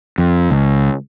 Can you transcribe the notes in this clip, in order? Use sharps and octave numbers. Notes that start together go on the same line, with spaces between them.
F2
C#2